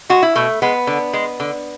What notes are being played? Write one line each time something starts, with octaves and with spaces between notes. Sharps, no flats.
G#3 F#4
E4
B2 A3
G#3 B3
D3
G#3
D3